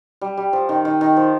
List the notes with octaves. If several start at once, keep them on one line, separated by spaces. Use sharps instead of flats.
G3
G3
F3
D#3
D#3
D#3
F3